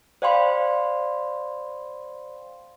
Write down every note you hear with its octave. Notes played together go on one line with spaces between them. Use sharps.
C5 D5 F5 G5 B5 C6